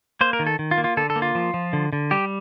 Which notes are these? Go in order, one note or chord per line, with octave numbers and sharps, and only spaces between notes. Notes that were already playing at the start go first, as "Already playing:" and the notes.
A#3 C5
A#4
D#3
A4
D#3
F4
A#3
F4
D3 A4
A4
A#3
F4
F3
F3
D3
D3
G3 G4